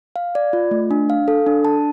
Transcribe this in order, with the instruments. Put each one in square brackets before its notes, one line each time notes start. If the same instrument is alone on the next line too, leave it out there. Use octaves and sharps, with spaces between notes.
[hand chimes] F5
D5
F4
A3
D4
F5
A4
D4
A5